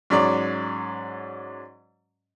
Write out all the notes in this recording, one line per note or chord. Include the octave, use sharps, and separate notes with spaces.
G#2 F#3 C#4 D5